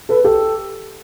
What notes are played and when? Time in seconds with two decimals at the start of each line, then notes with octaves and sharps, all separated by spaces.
0.09 A4 B4
0.24 G4 A4